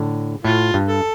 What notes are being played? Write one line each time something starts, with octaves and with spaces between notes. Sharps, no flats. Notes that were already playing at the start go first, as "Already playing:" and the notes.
Already playing: A2 D3
A2 A3 F4
G2
A4